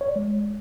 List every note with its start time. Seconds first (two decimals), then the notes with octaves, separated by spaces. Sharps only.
0.01 C#5
0.08 D5
0.16 G#3